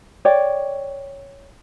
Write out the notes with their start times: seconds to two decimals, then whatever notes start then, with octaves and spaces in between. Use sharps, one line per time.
0.25 C#5 D5 G5